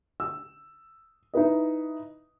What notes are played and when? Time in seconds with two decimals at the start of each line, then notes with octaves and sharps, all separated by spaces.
0.20 E6
1.34 D#4 E4 B4 D#5